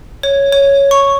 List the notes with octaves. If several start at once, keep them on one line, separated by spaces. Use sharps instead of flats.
C#5
C#5
C#6